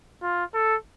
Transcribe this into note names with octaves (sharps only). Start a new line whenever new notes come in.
F4
A4